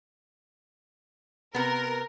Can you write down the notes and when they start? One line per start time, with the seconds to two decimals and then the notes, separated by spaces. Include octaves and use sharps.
1.55 C3 B3 A#4